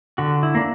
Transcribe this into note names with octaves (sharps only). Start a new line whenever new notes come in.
D3 F#4
E4
A#3 D4